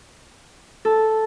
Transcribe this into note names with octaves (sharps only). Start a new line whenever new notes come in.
A4